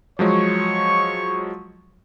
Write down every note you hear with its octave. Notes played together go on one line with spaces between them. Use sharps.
F3 F#3 G#3 C#5 C#6